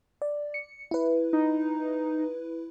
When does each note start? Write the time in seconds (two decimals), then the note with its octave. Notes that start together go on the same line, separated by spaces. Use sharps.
0.22 D5
0.54 C#7
0.91 E4 B4
1.33 D#4